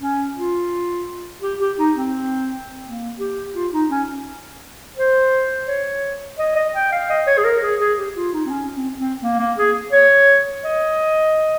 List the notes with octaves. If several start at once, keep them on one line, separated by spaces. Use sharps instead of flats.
C#4
F4
G4
G4
D#4
C4
A#3
G4
F4
D#4
C#4
C5
C#5
D#5
D#5
G5
F5
D#5
C#5
G#4
A#4
G#4
G#4
G4
F4
D#4
C4
C#4
C4
C4
A#3
A#3
G#4
C#5
D#5